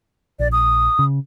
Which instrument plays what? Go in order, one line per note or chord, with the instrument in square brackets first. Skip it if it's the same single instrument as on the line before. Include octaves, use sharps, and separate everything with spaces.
[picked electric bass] A#1 [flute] D5
[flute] D#6
[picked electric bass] C#3